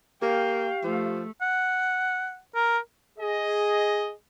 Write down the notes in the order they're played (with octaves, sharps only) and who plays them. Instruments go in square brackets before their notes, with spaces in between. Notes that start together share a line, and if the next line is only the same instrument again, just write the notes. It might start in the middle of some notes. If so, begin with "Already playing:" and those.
[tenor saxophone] A#3 [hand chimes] G4 [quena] F5 [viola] G5
[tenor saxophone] F3 [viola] A3
[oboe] F#5
A#4
[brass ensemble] G#4 D#5